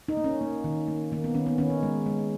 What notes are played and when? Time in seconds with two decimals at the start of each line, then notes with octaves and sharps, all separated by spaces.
0.08 D#4
0.17 A#3
0.24 C#4
0.41 A#3
0.64 D#3
0.88 A#3
1.12 D#3 A#3
1.24 B3
1.35 D#3 C#4
1.46 B3
1.58 D#3 C#4
1.70 D#4
1.83 G#3
2.06 G#3